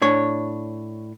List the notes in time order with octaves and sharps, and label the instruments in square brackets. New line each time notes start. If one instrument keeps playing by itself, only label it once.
[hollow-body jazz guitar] A2 D4 C#5